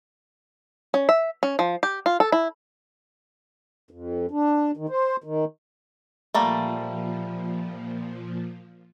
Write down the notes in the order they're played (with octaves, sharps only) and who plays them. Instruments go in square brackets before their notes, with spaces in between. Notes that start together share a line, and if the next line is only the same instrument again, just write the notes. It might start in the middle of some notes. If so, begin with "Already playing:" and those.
[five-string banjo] C#4
E5
C#4
F3
G4
F4
A4
E4
[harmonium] F2
D4
D#3
C5
D#3
[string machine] A#2 F3 [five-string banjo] G3 A3 A#3